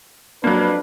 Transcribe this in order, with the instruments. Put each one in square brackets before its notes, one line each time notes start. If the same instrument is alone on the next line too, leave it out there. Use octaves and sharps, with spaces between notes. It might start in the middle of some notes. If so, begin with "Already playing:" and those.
[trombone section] F2 D4 B4 [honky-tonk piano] F#3 A#3